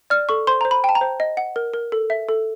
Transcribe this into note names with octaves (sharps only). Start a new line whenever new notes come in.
D5 F6
A4 C#6
C5 C6
C5 A#5
B5
G5 A5
A#5
C5
D#5
F#5
A#4
A#4
A4
E5
A4